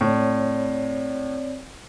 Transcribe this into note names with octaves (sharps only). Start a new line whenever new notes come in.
A2 C4 C#5 D5